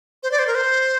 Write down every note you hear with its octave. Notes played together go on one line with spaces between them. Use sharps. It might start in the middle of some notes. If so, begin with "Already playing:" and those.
C5
D5
C5
A#4
C5